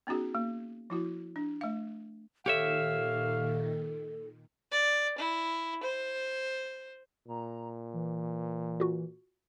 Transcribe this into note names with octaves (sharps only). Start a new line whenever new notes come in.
B3 C#4 D#4 F#4 G#4
A#3
F3 E4 F#4
D4
A3 F5
A#2 D#3 G4 A4 C#5 E5 F5
D5
E4
C5
A#2 A#5
E3
F4 F#4